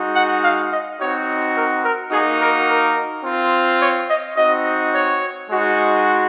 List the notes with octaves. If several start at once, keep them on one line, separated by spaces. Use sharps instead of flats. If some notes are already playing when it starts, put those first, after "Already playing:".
Already playing: G#3 D#4 F#4
F#5
F5
D#5
C4 D#4 F#4 C#5
A#4
A#4
A#3 D#4 F#4 G#4
A#4
A#4
C4 F4
C#5
D#5
C4 D#4 F#4 D#5
C#5
G#3 D#4 F#4